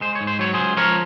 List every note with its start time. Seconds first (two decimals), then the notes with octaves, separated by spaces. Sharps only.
0.01 G#3 C5
0.15 C#5
0.21 G#2
0.27 C5
0.39 F#3 C#5
0.54 C#2 G#4 C5
0.77 F3 A#4 C#5